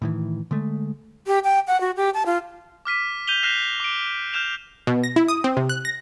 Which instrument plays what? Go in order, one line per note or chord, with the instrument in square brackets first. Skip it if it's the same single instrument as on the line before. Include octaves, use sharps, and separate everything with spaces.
[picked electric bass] A2 D#3 E3
D3 G#3 A3
[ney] G4
G5
F#5
F#4
G4
A5
F4
[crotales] D6 F6 B6 D#7
G6 D#7 F7 G7
F6 F#6 A#6 C7 E7 F7
D6 D7
F6 G6 E7 F7
[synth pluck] B2
A#6
E4
D#6
C4
C3
F#6
A#6